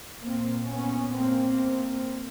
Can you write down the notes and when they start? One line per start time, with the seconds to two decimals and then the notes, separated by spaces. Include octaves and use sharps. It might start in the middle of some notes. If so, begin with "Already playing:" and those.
0.24 A#2 A#3 C4
0.70 B3 C#4
1.16 A#3 C4